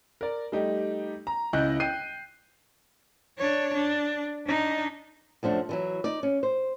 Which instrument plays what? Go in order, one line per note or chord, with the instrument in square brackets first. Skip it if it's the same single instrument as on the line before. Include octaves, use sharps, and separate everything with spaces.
[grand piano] A#4 D5
G3 A3 D#4 G4
A#5
C#2 E4 D#5 F#6 G6
G5 G6 C7 D#7
[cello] D4 C#5
D4
D4 D#4
[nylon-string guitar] F#2 F3 A3 D4
D3 E3 F#3
D#4 D5
C#4
C5